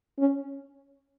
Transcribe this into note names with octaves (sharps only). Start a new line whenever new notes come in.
C#4